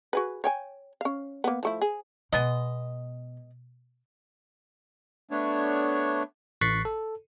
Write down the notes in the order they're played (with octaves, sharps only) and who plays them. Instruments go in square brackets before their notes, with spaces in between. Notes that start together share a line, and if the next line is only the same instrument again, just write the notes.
[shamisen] F#4 G#4 B4
C#5 G5 G#5
C#4 F5
A#3 B3
F3 A3 E4
G#4
[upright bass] B2 [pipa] G#3 B3 D#5
[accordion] A3 B3 D4 C#5
[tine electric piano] A1 C#6 F#6 A6 B6 C7
A4